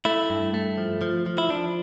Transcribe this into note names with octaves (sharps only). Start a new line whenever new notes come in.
A3 E4
G2
A3
F3
F3
F3
E4
F3 D4